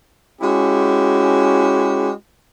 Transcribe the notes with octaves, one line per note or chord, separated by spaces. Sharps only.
G#3 C#4 E4 F#4 G4